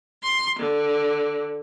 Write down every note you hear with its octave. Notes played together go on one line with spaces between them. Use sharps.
C6
D3